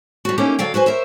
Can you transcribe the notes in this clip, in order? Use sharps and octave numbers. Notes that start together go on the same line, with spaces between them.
G3 F#4
A3 A#3 C#4 D#4 G4 A#4
D3 F#3 D5 F5 G5
F#4 B4 C5 G#5
A#4 C5 C#5 E5